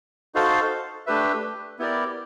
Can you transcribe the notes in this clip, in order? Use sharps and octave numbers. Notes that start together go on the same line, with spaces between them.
D#4 F#4 A4 C5 F5
A3 D4 G4 B4 E5
B3 E4 G4 A#4 D5